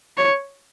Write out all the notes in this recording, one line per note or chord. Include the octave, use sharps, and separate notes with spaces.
C#5